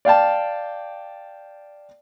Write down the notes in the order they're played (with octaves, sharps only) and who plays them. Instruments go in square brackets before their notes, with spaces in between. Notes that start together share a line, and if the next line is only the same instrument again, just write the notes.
[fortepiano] D5 F5 G5 A5